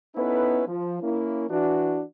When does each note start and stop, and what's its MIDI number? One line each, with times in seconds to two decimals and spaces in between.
0.16 0.63 59
0.16 0.63 61
0.16 0.63 63
0.16 0.63 64
0.16 0.63 69
0.16 0.63 71
0.67 0.98 53
1.02 1.46 58
1.02 1.46 61
1.02 1.46 64
1.49 2.02 52
1.49 2.02 62
1.49 2.02 66